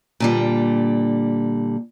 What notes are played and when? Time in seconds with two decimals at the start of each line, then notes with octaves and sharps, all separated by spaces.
0.20 A#2 D3 G3